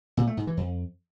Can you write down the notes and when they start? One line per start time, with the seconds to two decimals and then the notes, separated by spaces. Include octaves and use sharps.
0.17 A#2
0.27 A3
0.37 G#2
0.47 E3
0.57 F2